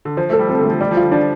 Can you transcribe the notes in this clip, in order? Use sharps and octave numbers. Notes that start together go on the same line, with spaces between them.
D3
F3 C5
A3 A4
G3
F3 C4
D3
A3
F3
G3 D5
F3
F4
D3
F3 D4